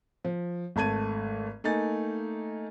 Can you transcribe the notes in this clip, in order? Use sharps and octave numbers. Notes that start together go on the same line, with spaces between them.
F3
G#1 A3 A5 G#6 D#7
A3 A#3 D#4 G#5 A6